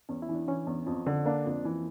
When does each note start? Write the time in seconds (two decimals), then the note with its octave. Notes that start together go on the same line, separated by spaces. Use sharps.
0.09 E2 C#4
0.22 E4
0.29 E3
0.35 D4
0.48 E3 C#4
0.67 E2
0.86 F2
1.07 D3
1.26 A#3 D4
1.46 F2
1.65 E3